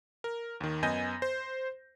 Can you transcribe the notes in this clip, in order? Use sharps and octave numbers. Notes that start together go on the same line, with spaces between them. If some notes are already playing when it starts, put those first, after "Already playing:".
A#4
D#2 D#3
F#2 B3 D#5 G#5 G6 A#6
C5